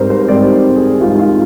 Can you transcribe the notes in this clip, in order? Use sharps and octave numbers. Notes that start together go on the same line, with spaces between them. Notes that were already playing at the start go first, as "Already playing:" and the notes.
Already playing: G#2 G3 C4 A#4 C5
C5
G#2 G3 C4 D5
G#4
G#2 G3 C4 F4
F4